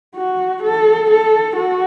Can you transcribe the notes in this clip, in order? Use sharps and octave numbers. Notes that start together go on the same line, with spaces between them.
F#4
A4
A4
F#4